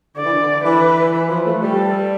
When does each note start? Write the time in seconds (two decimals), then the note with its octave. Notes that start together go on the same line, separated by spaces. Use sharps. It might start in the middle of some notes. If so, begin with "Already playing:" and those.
0.16 D3 D5
0.24 E3
0.32 D3
0.64 E3 B4
1.12 E3 B4
1.29 F3
1.45 A3
1.61 G3 A4